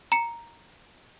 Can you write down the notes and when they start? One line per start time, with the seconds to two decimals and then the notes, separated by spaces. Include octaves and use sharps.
0.12 A#5 C#7